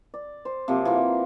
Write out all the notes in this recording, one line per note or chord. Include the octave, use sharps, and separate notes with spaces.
D5
C5
C3 F3 F#3 A#3
E3 F#3 F4